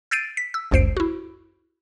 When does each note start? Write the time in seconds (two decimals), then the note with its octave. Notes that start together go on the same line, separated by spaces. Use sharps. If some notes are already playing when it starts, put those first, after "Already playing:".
0.11 E6 G6 A6 C7 D7 D#7
0.37 B6
0.54 E6
0.71 G1 C#2 F#2 C5 C7 D7
0.97 E4 F#4